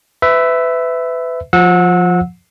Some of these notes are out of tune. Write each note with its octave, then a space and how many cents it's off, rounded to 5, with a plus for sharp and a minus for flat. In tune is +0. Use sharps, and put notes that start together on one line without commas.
B4 +30 E5 +0
F3 +15 F#5 -30 E6 -20